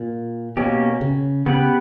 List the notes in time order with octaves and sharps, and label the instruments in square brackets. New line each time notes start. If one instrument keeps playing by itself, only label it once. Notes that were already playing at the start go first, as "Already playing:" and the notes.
Already playing: [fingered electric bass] A#2
[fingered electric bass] B2 [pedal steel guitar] A#3 C#4 G4
[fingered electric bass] C#3
[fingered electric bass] C#3 [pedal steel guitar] B3 G4 B4